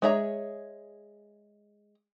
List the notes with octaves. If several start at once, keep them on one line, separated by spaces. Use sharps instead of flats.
G#3 G#4 C#5 E5 A#5